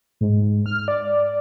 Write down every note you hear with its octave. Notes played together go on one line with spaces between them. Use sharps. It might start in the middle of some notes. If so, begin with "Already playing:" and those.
G#2
F6
D5